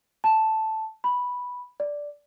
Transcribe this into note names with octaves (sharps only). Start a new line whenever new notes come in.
A5
B5
D5